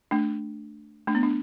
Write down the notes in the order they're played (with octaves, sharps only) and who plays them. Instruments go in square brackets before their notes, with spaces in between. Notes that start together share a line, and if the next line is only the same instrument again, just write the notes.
[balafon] A3 D4
A3 D4
B3
D4